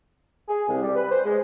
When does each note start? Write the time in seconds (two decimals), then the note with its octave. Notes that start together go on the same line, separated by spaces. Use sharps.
0.48 G#4
0.68 C2
0.83 G3
0.96 B4
1.11 C5
1.24 G#3